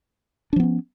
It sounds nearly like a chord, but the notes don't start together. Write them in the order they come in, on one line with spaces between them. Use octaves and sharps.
D4 F3 B3 C#4